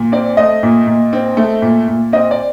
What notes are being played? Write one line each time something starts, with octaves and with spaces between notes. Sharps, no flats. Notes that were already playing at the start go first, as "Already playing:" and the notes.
Already playing: A#2
C4 D5
A3 D#5
A#2
A#2
C4
A3
A#2
A#2
C4 D#5
D5